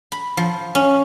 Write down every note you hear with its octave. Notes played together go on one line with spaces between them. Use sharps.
B5
F3
C#4